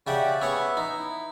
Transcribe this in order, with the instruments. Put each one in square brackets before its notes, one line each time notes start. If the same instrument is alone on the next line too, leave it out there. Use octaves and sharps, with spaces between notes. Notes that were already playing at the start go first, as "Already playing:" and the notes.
[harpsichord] C#3 E5 F#5 [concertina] G4 D5
[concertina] B3 E5 [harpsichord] C#4 C#5 F#5
[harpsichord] D#4
[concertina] E4